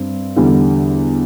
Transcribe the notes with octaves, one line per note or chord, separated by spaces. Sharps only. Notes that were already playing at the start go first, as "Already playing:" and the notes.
Already playing: G2 C4
E2 D3 G3